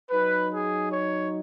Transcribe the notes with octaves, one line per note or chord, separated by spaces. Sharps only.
F#3 D#4 B4
G#4
C#5